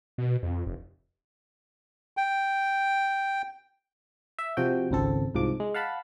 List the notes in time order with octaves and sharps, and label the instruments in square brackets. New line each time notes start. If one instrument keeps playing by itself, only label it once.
[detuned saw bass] B2
F2
F1
[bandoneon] G5
[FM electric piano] E5
C3 F3 F#4 G5
G#1 C#2 C4 A4
C2 G#2 F3 D6
G#3
F5 F#5 A5 B5